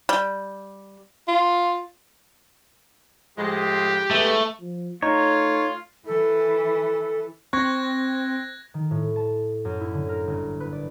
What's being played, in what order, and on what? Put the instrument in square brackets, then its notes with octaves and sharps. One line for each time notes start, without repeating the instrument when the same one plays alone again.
[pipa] G3
[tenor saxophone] F4
[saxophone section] A2 F3 G#3 [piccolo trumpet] G4
[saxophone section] E2 G#3 B4 [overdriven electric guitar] A3
[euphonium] F3
[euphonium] A3 [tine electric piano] D#4 [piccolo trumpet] F4 [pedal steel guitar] C#5
[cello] E3 [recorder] A4
[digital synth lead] C4 [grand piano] C#6 [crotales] F#6 G#6 A#6
[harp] D#3
A2
A5
F#2
E4
D3
A#4
G1
B4
D5